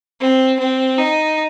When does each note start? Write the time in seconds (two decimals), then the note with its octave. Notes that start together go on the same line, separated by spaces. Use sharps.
0.21 C4
0.60 C4
0.98 D#4